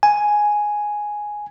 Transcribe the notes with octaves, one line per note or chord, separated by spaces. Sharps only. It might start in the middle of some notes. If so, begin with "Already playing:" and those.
G#5